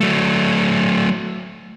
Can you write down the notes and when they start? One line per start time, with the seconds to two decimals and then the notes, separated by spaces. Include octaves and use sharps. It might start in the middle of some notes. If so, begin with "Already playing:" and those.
0.01 F#3 A3